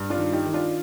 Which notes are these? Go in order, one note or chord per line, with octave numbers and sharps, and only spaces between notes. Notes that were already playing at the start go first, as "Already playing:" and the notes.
Already playing: G2
D4 F4
D#3
D#4 G4
D#3
D4 F4